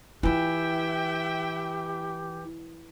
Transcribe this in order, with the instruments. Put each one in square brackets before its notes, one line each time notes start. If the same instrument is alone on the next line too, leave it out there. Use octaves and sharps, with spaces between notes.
[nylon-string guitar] E3 [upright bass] E4 F4 [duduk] G4 [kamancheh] E5 G5